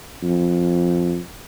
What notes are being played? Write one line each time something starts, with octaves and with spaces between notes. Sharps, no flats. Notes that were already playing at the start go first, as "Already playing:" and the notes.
F2